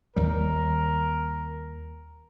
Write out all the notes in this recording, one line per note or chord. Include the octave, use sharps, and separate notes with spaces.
D#2 G3 A#4